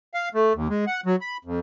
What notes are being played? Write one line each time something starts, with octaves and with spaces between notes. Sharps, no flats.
F5
A3
D#2
G#3
F#5
F#3
B5
F2